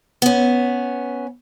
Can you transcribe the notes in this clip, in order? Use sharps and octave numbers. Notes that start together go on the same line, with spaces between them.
B3 C#4